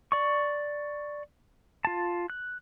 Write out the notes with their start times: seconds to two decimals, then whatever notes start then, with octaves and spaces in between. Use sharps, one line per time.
0.12 D5 C#6
1.85 F4 A5
2.30 F#6